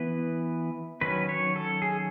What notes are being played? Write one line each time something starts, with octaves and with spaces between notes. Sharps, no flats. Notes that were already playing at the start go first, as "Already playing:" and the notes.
Already playing: E3 B3 B4
D#3 F#3 C#4 B4
C#5
A4
G#4